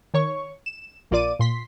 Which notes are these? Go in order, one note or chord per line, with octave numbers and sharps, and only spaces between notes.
D#3 C#5 C#6
E7
A#1 A#3 F4 D5 D6 D#7
A#2 C6 B6